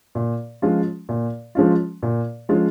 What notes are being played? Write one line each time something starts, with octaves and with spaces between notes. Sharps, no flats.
A#2
F3 G#3 C#4 F4
A#2
F3 G#3 C#4 F4
A#2
F3 G#3 C#4 F4